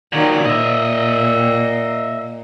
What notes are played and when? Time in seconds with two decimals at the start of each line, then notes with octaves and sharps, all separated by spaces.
0.13 A#2 D#3 F#3 D5
0.46 A#2 D#5 E5